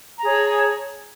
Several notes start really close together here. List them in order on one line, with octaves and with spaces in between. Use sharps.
A#5 G#4 C#5 A5